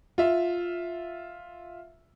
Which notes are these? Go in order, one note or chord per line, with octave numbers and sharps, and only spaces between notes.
F4 E5